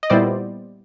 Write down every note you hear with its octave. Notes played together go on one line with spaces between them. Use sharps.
D#5
A#2 G3 B3 E4 C5 D5